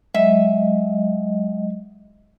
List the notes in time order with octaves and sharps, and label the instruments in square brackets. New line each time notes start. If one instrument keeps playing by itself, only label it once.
[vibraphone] F#3 G#3 D#5 [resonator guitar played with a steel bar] E5